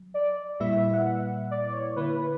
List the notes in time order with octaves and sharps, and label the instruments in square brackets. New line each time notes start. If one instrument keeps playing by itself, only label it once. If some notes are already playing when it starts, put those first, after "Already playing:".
Already playing: [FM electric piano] F#3
[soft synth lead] D5
[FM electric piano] A#2 G3 A#3 E4 B4 [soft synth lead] E5
[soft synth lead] F#5
D5
C#5
[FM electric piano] D3 A#3 E4 [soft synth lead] B4